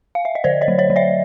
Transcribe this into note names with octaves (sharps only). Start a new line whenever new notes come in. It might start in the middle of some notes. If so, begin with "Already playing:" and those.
F5
E5
D#5
D3 C5 D5
C#5 D#5
F#3
C#5 D#5
F#3
D5 E5